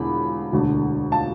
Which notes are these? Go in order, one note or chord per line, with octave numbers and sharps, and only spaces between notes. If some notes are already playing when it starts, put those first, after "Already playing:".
Already playing: E1 E2 D3 B5
E1 D2 D3
A5